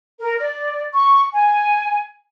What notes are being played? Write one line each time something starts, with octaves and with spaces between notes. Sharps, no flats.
A#4
D5
C#6
G#5